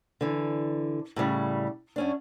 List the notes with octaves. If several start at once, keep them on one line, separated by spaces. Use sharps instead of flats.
D3 E3
A2 C#3 G3
F#2 C#4 D4